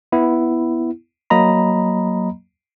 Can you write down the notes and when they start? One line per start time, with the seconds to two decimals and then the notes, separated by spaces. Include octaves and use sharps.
0.12 B3 E4
1.30 F#3 A#3 D#5 A#5 B5